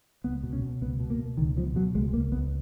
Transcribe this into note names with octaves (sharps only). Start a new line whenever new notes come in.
C#2 B3
B2
C#4
B2
C#2 B3
B2
A#3
B2
C#2 D#3
B2 F3
B2 F#3
C#2 G#3
C#2 A#3
C#2 B3